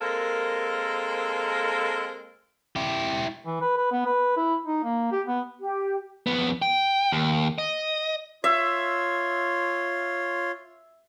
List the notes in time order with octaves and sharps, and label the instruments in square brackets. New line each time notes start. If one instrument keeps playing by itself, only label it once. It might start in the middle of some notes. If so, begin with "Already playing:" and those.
[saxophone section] G#3 A#3 C4 A4 A#4
[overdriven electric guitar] E4 G4
[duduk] E3
B4
B4
B3
B4
E4
D#4
A#3
G4
B3
[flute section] G4
[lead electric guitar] F2 B3
G5
D#2
D#5
[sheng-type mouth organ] F4 C#5 C6 [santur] E5